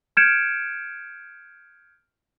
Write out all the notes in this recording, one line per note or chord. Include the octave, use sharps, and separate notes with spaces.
F6 G6 G#6 C#7 D7 E7